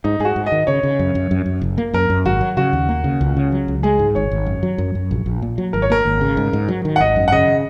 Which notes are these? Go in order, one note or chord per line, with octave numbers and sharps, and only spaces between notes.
G#2 D#4
G#2 G#4
F#4
G#2
D#5
D#3
C#3 C#5
C#3
F#2
F#2
F#2
F#2
F#1
A#3
F#2 A#4
F#2
G#1 F#4
F#3
C#3 F#4
D#2
A#3
C#3
C#2
C#3
F#3
C#2
G#3 G#4
G#2
G#1 C#5
G#1
F#2
F#3
F#2
F#2
A#1
A#1
A#2
F#3
G#1 A#4
C#5
A#3 A#4
G#1
C#3
G#2
G#2
F#3
D#3
F#5
G#1 D#5
F#2
F#5
C#3 D#5